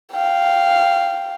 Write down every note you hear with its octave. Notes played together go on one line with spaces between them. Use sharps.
F5 G5